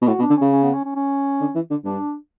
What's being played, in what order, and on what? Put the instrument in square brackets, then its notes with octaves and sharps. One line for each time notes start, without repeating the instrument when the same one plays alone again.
[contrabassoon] B2
[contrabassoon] A2 [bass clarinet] F#4
[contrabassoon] B2
[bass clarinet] D4
[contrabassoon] D3
[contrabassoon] C#3 [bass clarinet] C#4
[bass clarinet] C#4
B3
C#4
C#4
C#4
[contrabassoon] D3
E3
D3
[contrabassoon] G2 [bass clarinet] D4